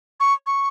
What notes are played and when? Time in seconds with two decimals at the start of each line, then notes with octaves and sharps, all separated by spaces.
0.20 C#6
0.47 C#6